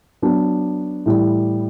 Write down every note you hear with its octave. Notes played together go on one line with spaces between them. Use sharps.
F#3 B3 D4
A2 E3 G3